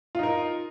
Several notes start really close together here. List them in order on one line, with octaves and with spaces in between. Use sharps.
F4 D#4 A#4